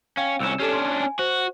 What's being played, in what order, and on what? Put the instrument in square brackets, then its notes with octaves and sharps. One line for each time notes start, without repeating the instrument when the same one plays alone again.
[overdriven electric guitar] C#4 [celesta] F5 G5
[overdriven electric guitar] C2 C#4 [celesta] E6 C#7 E7
[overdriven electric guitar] C#4 D4 [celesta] G4 A4 E7
[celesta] C6
G#5
[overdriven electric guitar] F#4 [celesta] C5